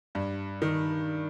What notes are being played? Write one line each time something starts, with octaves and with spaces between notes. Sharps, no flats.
G2
D#3